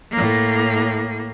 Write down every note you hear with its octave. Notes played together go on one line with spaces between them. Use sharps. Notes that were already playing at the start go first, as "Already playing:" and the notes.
A2 A#3